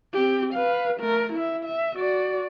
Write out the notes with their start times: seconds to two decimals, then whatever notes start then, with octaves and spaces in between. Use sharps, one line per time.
0.14 C4 G4
0.54 B4 F5
1.00 A3 A#4
1.33 E4 E5
1.65 E5
1.96 F#4 D5